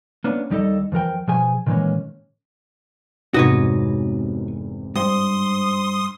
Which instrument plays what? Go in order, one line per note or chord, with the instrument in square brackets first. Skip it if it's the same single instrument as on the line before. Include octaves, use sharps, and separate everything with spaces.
[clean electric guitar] A#3 B3 C#4 D4
D#2 G3 D#4 A4 D#5
E2 F3 A#4 G5
B2 F3 G#4 G#5
A#2 D#3 E3 G#3 A#3 C#4
[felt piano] F1 E2 C3 [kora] G#2 D#5 [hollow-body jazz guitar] F#4 B4 C#5
[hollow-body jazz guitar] G2 [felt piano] C5 [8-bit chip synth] C6 D#6